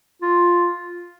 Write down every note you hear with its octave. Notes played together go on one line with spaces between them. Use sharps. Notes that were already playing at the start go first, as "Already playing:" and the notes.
F4